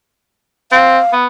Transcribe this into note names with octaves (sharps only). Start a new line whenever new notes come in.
C4 F5
B3